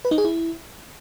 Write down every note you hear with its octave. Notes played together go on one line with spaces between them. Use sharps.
B4
D#4
G#4
E4